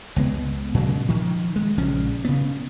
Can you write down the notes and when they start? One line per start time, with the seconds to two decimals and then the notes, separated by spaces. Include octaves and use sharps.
0.16 C#2 G#3 B3
0.74 A#2 C#3 F#3 G#3
1.08 D#3 F3
1.56 G#3
1.77 A#1 C#3 F3 C#4
2.25 C#3 B3